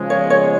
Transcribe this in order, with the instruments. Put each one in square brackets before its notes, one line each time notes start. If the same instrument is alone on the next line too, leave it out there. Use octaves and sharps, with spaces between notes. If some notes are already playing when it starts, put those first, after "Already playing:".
Already playing: [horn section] C#3 F3 G#3
[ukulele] C#5
C#5